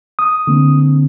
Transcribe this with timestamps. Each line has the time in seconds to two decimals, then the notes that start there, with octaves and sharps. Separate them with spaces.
0.19 D#6
0.47 D3 A#3 C4